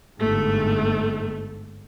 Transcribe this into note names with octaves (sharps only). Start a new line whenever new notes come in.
G1 G#2 A3